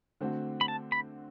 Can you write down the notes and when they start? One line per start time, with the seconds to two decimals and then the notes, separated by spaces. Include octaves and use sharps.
0.21 D3 A3 C4 F#4
0.61 B5
0.68 A5
0.92 B5